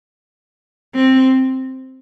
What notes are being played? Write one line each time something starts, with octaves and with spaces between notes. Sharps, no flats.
C4